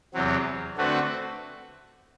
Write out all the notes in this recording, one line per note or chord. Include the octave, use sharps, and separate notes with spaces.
E2 C3 F#3 C4
D3 A3 C4 F#4 B4